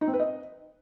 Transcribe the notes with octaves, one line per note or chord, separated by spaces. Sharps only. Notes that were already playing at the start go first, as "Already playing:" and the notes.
D#4
C4
B4
D#5